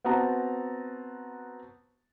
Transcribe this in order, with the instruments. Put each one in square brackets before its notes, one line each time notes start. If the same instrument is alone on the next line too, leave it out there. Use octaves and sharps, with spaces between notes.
[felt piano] B3 C4 F#4 A5 A#5